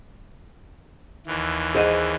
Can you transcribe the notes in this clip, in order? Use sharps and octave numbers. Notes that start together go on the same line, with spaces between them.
D#2 E3
G#4 C5 D#5